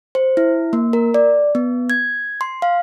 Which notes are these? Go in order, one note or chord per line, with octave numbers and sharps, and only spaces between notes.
C5
E4
A#3
A#4
D5
B3
G#6
C6
F5